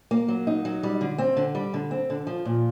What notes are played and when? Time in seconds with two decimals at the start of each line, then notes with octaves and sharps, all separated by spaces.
0.11 A#3
0.28 F#3
0.47 D#4
0.65 F#3
0.83 G3
1.01 D3
1.18 C4
1.37 D3
1.55 G3
1.74 D3
1.91 C4
2.10 D3
2.27 F3
2.45 A#2